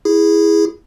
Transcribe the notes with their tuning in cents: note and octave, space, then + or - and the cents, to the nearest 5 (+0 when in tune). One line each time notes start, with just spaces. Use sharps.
E4 +0 G#4 -10